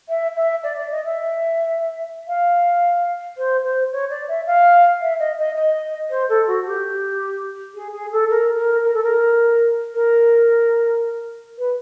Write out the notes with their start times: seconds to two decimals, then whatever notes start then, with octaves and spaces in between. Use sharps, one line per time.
0.08 E5
0.36 E5
0.63 D5
0.76 D5
0.90 D#5
1.04 E5
2.27 F5
3.37 C5
3.63 C5
3.91 C#5
4.09 D5
4.28 E5
4.46 F5
5.01 E5
5.19 D#5
5.37 D#5
5.56 D#5
6.10 C5
6.28 A4
6.47 F#4
6.65 G4
7.74 G#4
7.93 G#4
8.11 A4
8.29 A#4
8.57 A#4
8.84 A#4
8.93 A4
9.03 A#4
9.94 A#4
11.58 B4